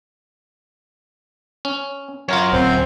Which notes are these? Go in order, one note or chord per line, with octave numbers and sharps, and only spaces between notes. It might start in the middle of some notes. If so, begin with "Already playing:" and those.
C#4
F#2 F4 A#4 C#5
D1 C4 C5